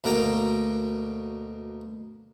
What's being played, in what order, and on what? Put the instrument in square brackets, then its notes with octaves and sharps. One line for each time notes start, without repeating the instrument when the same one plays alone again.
[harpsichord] D2 B2 A#3 A#4 G5 A#5